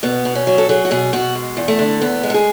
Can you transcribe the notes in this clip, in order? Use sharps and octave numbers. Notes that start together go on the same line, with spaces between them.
B2 B3
B2
C#4
F#3
A4
F#3 G#4
F#4
B2 G#4
B2 F#4
G#3
E2
A3
D3
E2 B3
G#3
A4
G#4